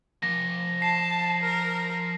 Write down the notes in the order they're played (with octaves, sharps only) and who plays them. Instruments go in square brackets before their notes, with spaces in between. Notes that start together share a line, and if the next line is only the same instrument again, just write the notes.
[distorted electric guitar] F3 G#5 [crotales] A#6
[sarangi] A5 [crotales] C7
[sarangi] A#4